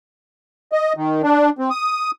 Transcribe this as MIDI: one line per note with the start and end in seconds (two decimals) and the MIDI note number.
0.72 0.93 75
0.97 1.22 51
1.23 1.50 62
1.59 1.70 60
1.70 2.11 87